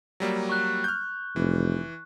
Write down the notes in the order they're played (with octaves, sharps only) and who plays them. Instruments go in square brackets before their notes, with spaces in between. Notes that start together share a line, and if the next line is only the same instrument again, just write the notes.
[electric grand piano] F#3 G3 A#3
[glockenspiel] C#6 F#6
[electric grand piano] F6 G6
[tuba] F1 [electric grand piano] E3